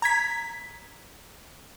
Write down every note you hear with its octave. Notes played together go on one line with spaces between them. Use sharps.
A#5 G#6 B6